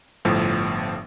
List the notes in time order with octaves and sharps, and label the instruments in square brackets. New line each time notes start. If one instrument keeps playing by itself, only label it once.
[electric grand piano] G1 A2 F3